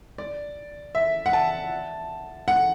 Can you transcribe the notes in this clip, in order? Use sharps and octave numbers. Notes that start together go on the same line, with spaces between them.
D5
E5
F#5
A5
F#5